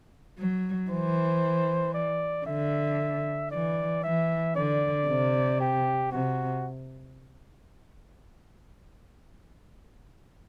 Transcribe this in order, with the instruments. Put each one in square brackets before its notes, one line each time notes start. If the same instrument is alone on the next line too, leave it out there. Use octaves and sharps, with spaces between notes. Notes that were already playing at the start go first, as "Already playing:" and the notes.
[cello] F#3
[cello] E3 [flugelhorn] C5
[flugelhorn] D5
[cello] D3 [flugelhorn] E5
[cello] E3 [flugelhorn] D5
[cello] E3 [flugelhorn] E5
[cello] D3 [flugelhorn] D5
[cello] C3
[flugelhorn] G4
[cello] C3 [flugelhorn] F#4